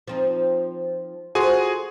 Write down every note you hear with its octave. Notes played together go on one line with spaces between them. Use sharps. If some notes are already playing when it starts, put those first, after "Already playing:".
F3 C4 D#4
F4 F#4 G#4 A4 C5 G#5